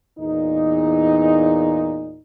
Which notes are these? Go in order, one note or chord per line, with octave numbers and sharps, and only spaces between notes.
E2 A#2 D#4